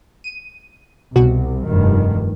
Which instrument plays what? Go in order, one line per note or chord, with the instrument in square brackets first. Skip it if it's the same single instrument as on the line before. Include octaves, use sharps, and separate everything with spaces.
[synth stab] D#7
[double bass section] C2 [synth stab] B2 F#4
[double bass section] F1 G2 D#3